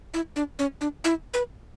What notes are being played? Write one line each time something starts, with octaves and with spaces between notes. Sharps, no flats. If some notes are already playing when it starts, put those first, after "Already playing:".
E4
D4
C#4
D4
E4
B4